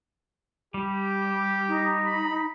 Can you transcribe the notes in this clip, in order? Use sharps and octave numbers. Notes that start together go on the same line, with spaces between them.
G3 G4
D#4
B5